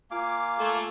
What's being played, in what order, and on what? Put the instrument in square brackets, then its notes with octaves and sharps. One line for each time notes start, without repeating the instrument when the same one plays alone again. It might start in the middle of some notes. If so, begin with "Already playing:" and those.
[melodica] A#3 F5 D6 [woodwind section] F4 G#5
[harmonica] A3